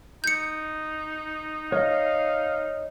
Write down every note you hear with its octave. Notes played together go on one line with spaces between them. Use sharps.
D#4 G6 C#7
C#5 D#5 F5